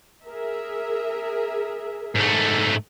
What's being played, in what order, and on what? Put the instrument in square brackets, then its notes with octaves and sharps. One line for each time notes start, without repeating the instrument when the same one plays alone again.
[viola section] G#4 A#4 E5
[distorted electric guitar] G#2 A3